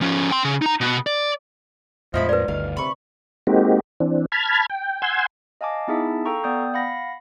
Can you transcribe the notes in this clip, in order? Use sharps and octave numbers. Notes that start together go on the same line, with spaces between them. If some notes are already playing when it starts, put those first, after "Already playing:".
F3 C#4
G5 C6
C#3
D#4 A#5
B2 B3
D5
E2 A2 F3 G#3 D#4 E4 B5
A#4 B4 D5
G1 D2 G2 D#3 F5
C3 B5 C#6
G#3 A#3 C4 D#4 F#4 G4
E3 C4 D4
A5 B5 F6 G#6
G5
F#5 G#5 C6 E6 G6 G#6
D#5 F5 G#5 A5 D6
B3 D#4 E4 G#4 E5 A5
A4 F5 G5 A#5 C#6
B3 D5 G5 D#6 G6
F5 F#5 B5 A#6